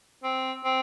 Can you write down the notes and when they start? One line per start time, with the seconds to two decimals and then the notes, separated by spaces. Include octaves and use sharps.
0.24 C4
0.65 C4